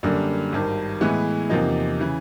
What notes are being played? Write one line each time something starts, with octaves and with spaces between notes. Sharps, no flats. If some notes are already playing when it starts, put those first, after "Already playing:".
F#2 D3 G3 A#3
G#1 G2 D#3
A2 E3 G#3 B3
E2 C3 F3 A#3 D#4
C#3 E3